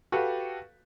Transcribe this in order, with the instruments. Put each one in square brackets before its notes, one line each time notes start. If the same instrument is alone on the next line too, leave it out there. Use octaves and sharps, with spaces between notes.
[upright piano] F#4 G4 A4 B4 F5